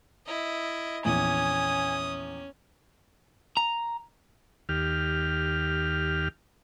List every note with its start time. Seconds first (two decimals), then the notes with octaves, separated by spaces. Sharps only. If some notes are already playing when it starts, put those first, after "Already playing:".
0.27 E4 D#5
1.05 A#1 E2 C#4 G#5 D#6
3.57 A#5
4.69 D#2 G4 F6